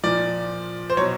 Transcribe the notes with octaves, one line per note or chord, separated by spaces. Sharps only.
A#2 F3 D5
C5
B2 F#3 C#5